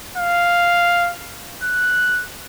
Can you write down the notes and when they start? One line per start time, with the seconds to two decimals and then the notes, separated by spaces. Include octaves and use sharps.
0.17 F5
1.63 F#6